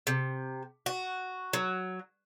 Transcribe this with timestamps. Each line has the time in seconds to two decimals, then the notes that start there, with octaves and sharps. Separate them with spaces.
0.07 C3
0.86 F#4
1.53 F#3